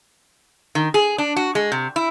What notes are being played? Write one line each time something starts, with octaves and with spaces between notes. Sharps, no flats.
D#3
G#4
D4
F#4
G#3
C3
E4